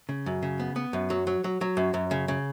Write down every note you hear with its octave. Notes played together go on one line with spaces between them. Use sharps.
C#3
F#2
C#3
B3
B3
F#2
F#3
F#3
F#3
F#3
F#2
F#2
C#3
C#3